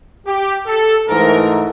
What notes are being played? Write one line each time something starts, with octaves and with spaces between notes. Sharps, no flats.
G4
A4
G#2 E3 A3 A#4